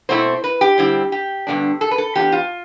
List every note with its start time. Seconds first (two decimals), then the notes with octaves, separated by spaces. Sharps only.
0.09 B2 A3 C4 E4 C5
0.44 B4
0.61 G4
0.78 D3 G3 C4 E4
1.12 G4
1.47 G2 D3 F3 B3 D4
1.81 A4
1.91 B4
1.98 A4
2.15 E3 B3 D4 F4 G4
2.32 F4